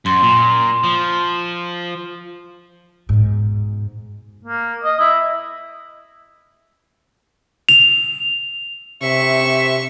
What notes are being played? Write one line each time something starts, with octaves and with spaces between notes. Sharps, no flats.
F#2 C6
A#2
F3
G#2 B2
A#3
D#5
E4
F7
C3 E5 C#6